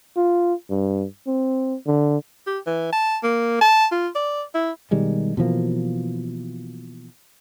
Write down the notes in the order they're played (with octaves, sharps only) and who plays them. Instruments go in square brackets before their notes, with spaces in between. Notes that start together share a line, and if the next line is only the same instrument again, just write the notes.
[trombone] F4
G2
C4
D3
[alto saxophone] G4
E3
A5
A#3
A5
F4
D5
E4
[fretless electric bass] B2 D#3 G3 G#3
B2 E3 F3 A#3